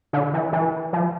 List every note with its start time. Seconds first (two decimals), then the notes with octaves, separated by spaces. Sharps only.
0.13 D3
0.34 E3
0.53 E3
0.93 F3